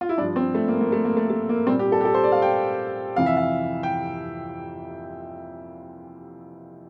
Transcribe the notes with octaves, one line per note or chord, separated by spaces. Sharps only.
F4
E4
G2 F3 D4
C4
A3
A#3
A#3
A3
A#3
A3
A3
A#3
A#2 G3 C4
G4
A4
G4
A4
C5
D5
F5
G5
F2 C3 E3 F5
E5
F5
G5